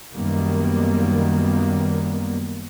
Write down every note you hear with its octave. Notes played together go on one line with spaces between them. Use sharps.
F#2 D#3 G3 A#3 B3